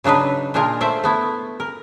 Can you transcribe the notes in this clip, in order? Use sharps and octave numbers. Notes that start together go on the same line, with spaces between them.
C#3 F#3 D4 D#4 B4
A#2 G#3 D4 F4 A#4
A3 C5 D5 E5
A3 B3 E4
A#4